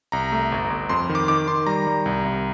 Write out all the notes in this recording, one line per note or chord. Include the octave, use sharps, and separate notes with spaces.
C2 A#5
A3
G1
G1
F2 C6
D#3
D6
D#3 D6
D#3 C6
G3 A#5
G3
C2
C2